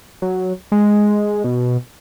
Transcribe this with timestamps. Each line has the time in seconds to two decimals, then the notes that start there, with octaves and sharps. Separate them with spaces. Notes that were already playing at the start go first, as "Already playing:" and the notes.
0.22 F#3
0.72 G#3
1.44 B2